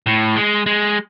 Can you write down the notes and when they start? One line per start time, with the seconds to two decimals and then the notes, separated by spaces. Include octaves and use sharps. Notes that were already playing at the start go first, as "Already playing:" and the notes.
0.06 A2
0.36 G#3
0.66 G#3